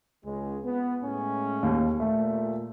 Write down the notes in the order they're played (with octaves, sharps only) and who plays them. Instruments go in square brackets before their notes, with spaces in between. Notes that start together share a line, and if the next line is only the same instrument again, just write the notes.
[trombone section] C#2 G#3
B3
A2 G#3 C#4
[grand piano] D#2
[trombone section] A#2 [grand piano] A3